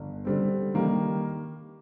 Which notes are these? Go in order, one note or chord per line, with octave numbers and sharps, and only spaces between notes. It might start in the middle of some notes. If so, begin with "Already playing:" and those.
Already playing: G1
D3 G3 C4
D#3 G3 A#3